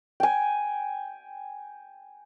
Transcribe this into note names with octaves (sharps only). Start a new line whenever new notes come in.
G5 G#5